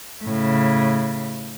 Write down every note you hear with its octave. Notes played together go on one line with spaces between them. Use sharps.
A2 C#3